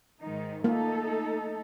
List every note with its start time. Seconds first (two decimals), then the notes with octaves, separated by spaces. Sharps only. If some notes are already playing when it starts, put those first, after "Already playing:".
0.20 G#2 D#3 D#4
0.64 A3 A#3 D#4 A4